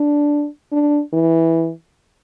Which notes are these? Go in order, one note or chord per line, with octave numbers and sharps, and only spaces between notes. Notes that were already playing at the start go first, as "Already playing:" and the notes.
Already playing: D4
D4
E3